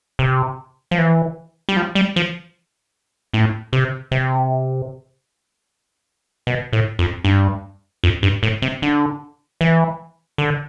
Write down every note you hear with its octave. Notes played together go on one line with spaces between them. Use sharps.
C3
F3
E3
G3
F3
G3
F3
A2
C3
C3
B2
A2
F2
G2
F2
G2
A2
C3
D3
E3
D3